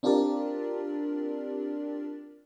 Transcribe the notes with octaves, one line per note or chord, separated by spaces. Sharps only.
C4 D4 F4 G4 A#4 D5